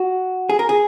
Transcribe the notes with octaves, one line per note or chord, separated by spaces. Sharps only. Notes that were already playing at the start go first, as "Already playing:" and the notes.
Already playing: F#4
G#4
A#4
G#4